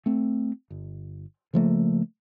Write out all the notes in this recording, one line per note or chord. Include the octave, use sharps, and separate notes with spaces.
A3 C4
G1
C#3 F3 A3 A#3